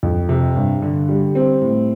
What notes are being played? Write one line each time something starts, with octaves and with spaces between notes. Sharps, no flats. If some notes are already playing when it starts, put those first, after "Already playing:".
F2
C3
G2
D3
G3
C4
A2